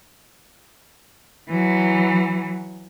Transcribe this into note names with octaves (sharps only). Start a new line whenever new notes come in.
E3 F#3